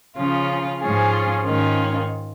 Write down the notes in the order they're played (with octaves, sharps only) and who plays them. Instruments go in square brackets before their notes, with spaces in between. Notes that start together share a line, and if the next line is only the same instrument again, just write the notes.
[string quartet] C#3 F3 C#4 F4
G#2 F3 C#4 F4 G#4
G#2 D#3 C#4 F4